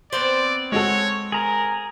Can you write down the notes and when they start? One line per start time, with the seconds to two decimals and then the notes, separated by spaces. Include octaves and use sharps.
0.13 B3 C4 C5 D5
0.72 G#3 F#4 A4 C#5
1.32 G#4 A#4 A#5